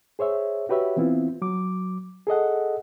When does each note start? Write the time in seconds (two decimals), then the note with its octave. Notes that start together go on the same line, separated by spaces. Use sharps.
0.19 G#4 C5 C#5 E5
0.69 F#4 G4 B4 C#5 E5
0.97 E3 B3 C4 E4 F4
1.42 F#3 D6
2.27 G#4 A4 D#5 F#5